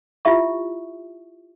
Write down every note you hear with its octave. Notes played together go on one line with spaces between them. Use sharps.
E4 F4 G4 E5 C#6